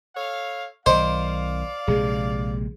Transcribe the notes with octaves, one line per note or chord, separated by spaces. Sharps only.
A4 C#5 F5
B1 D#3 C5 D5 D#5 F5
A#1 C3 G#3 G#4